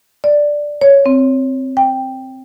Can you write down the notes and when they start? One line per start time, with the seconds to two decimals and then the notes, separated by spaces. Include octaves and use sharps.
0.24 D5
0.81 C#5
1.06 C4
1.77 G5